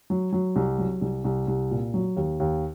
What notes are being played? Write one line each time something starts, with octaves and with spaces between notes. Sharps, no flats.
F#3
F#3
C2
F#3
C2
C2
C2
A#2
F#3
D#2
D#2